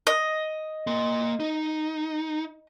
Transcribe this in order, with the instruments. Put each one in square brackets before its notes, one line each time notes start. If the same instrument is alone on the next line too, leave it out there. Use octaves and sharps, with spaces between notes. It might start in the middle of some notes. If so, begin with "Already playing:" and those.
[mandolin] D#5
[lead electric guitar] A#3 C6
D#4